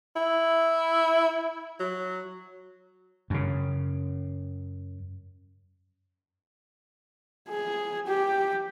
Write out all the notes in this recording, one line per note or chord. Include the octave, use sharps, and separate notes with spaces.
E4
F#3
F#2 C#3
G#4
G4